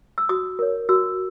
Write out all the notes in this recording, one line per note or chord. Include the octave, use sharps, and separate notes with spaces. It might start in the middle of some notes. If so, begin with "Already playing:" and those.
E6
F#4 D#6
A#4 C#5
F#4 E6